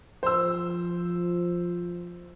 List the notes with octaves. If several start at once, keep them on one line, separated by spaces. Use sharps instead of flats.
F3 C5 E6